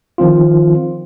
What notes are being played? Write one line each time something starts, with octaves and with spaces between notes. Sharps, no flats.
D#3 F3 C4 F4